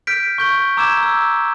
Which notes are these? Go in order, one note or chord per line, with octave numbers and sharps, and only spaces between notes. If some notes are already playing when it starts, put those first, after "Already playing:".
F6 G6 B6 D7
C#6 G6 G7
A#5 D6 E6 G6 G#6 E7
E6